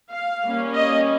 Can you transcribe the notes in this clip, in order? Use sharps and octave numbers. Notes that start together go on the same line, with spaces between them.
F5
G3 A#3 C#4
D#5